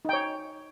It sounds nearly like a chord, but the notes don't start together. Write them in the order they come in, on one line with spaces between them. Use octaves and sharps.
D#4 G5 C#5